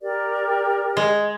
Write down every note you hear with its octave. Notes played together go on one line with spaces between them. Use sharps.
G4 A#4 D5
G#3